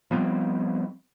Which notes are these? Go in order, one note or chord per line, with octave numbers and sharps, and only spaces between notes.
F3 G3 B3 C4